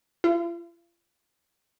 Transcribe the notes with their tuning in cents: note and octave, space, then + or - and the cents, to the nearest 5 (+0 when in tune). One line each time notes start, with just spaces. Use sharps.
F4 -40